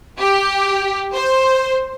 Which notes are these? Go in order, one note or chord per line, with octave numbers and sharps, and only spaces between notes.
G4
C5